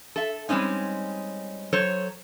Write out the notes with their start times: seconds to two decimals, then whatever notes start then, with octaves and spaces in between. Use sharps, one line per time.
0.16 A4 E5
0.49 G3 G#3 C4 C#4 D#4
1.73 F#3 A4 C5 C#5